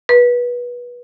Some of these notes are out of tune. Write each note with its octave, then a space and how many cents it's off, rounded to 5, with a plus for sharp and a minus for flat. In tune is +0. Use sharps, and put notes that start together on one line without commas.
B4 -25